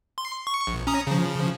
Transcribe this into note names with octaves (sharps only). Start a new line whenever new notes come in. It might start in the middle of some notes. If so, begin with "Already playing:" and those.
C6
C#6
A#1
C#4 A#5 D#6
C#3 F3